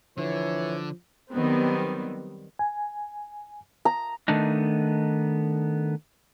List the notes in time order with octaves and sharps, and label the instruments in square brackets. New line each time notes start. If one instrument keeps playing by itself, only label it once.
[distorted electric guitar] D3 [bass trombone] E3 [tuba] F3 [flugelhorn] C#5
[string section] D#3 F#3 G3 B3 C4
[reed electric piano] G#5
[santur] A#5
[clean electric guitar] D#3 A3 B3 D4 D#4